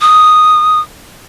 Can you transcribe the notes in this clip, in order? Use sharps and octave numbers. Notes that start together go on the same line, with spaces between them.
D#6